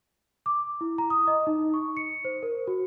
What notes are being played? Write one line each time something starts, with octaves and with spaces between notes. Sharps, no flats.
D6
E4
A#5
D#6
D#5
D#4
C#6
C#7
C5
A#4
F#4